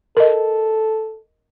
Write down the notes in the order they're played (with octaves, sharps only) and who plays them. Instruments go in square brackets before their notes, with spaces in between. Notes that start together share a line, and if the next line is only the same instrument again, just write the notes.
[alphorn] A4 [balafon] A#4 D#5